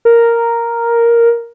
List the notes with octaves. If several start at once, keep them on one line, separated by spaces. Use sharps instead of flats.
A#4